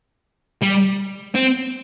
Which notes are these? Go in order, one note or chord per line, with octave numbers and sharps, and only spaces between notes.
G3
C4